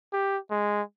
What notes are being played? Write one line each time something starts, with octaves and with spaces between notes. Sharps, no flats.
G4
G#3